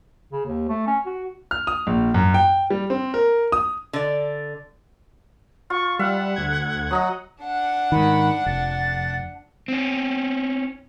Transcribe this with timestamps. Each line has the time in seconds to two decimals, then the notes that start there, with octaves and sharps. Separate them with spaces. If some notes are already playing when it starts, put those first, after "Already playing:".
0.32 C#3
0.46 D#2
0.69 A3
0.87 C#4
1.06 F#4
1.51 F6
1.67 D#6
1.87 A#1
2.14 F#2
2.34 G5
2.70 G3
2.90 C4
3.14 A#4
3.52 D#6
3.93 D3 D5
5.70 F4 C#6
5.99 G3 E5 F#5
6.36 D2 G#6
6.91 F#3 D#5 A#5 D#6
7.44 D4 F#5
7.92 G#2 D#3 B5
8.46 F1 A6
9.68 C4 C#4